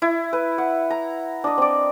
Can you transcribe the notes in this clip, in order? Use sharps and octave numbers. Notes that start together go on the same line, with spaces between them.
E4
B4
F#5
A#5
D4 D#5
C4 D5